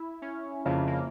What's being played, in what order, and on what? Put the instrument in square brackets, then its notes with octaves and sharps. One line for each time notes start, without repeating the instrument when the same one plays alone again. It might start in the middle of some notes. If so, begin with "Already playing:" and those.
Already playing: [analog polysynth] E4
C#4
[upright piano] F2 C#3 F3 [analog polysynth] A#3
[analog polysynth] A#3